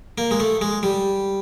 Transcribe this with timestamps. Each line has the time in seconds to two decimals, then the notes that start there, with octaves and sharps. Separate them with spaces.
0.18 A#3
0.31 G#3
0.40 A3
0.61 G#3
0.83 G3